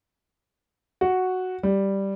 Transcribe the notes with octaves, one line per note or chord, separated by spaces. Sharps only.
F#4
G3